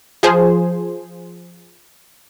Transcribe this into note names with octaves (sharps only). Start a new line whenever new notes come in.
F3 G#4 C5